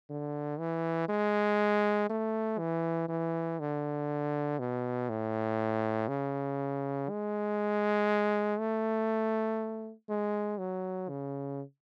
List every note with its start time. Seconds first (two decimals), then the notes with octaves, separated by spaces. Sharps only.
0.10 D3
0.59 E3
1.09 G#3
2.09 A3
2.58 E3
3.08 E3
3.60 D3
4.59 B2
5.09 A2
6.08 C#3
7.09 G#3
8.59 A3
10.09 G#3
10.58 F#3
11.09 C#3